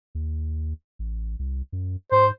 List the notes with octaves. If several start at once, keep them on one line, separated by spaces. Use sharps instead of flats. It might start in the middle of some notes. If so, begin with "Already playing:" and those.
D#2
A1
C2
F#2
G#2 C5